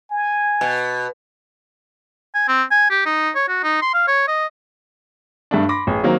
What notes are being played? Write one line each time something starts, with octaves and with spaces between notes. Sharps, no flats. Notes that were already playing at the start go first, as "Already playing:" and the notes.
G#5
B2
G#5
C4
G#5
G4
D#4
C#5
F#4
D#4
C6
F5
C#5
D#5
G2 A3 D4
B5 C6 D6 A#6
A1 G#4
D#3 F#3 A#3 C4